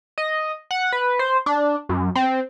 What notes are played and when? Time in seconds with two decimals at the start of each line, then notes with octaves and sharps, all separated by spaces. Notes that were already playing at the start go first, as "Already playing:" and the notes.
0.18 D#5
0.71 F#5
0.92 B4
1.19 C5
1.46 D4
1.89 F#2
2.15 C4